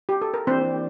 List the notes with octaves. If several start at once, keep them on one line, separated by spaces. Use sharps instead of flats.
G4
A4
A#4
E3 A#3 C4 D4 G4 C5 D5